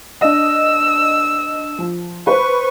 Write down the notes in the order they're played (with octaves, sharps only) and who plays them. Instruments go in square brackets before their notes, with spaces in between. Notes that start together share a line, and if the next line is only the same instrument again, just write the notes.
[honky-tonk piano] D4 D#5 [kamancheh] E6
[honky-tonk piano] F3
[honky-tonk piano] B4 C5 [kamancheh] C#6